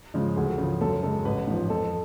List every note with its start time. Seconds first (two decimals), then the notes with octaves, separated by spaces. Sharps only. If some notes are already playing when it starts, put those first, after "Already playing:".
0.14 C#3 F3 G#3
0.36 D2 G#4
0.58 C#3 F3
0.81 F#2 A4
1.03 C#3 G#3 A4
1.25 A1 B4
1.47 G#2 F3
1.70 F2 A4